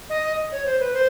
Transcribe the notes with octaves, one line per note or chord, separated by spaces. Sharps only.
D#5
C#5
C5
B4
C5